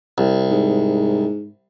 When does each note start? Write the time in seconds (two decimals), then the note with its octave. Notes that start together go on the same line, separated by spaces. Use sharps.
0.18 C2
0.51 G#2